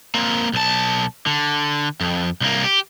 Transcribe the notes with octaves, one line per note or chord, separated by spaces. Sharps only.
A#3 C4
B1 A5
D3
F2
C2 A#3
G4